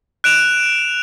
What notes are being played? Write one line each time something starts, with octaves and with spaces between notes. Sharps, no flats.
F#6 D7 E7 F7